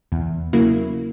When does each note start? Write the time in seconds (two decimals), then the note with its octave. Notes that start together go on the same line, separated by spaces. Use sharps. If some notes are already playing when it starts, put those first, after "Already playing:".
0.12 E2
0.53 C#3 F#3 A#3 E4